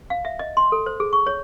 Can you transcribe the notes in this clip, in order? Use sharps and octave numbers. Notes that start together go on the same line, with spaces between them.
F5
E5
D#5
C6
A4
C5
G#4
C#6
C#5